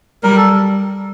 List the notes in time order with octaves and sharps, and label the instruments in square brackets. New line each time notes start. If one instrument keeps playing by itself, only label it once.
[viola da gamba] G3 [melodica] A#4
[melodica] A4